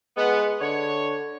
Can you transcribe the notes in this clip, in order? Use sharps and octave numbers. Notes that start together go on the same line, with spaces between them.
G#3 B3
D3 C#5